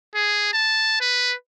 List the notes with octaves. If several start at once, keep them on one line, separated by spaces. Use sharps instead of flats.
G#4
A5
B4